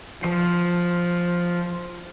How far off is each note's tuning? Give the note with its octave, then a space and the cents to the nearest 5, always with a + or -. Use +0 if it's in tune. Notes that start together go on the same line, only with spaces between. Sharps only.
F3 +5